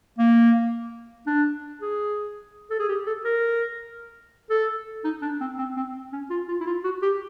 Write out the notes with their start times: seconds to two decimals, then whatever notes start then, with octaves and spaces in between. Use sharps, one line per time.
0.18 A#3
1.26 D4
1.81 G#4
2.70 A4
2.79 G#4
2.89 G4
3.06 A4
3.25 A#4
4.50 A4
5.04 D#4
5.22 D4
5.40 C4
5.58 C4
5.76 C4
6.13 C#4
6.30 F4
6.48 F4
6.60 E4
6.66 F4
6.84 F#4
7.02 G4